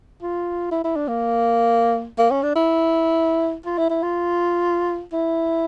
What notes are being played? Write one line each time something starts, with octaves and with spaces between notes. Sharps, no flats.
F4
E4
E4
D4
A#3
A#3
C#4
D4
E4
F4
E4
E4
F4
E4